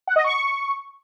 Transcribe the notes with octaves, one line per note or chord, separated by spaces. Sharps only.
F#5
D#5
C#6